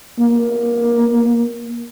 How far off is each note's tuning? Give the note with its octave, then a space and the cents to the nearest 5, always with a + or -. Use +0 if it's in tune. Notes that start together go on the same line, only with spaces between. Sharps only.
A#3 +20